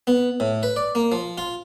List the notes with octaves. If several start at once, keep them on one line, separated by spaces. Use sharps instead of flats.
B3
A2
B4
D5
A#3
F3
F4